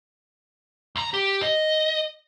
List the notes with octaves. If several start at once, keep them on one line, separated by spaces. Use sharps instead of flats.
C#2 A#5
G4
D#5